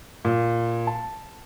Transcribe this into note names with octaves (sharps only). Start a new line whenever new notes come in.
A#2
A5